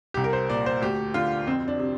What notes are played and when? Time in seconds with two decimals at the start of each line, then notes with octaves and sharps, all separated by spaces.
0.14 C2 G4
0.24 A#4
0.33 C5
0.50 A#2 D5
0.66 C5
0.82 D2 G4
1.14 D3 F4
1.47 F2 C4
1.68 D4
1.79 C3